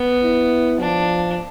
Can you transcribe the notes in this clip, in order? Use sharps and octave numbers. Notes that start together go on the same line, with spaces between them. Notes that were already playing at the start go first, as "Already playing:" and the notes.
Already playing: B3
E4
F3 D4